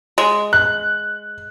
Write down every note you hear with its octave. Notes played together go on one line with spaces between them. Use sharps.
G#3
F#6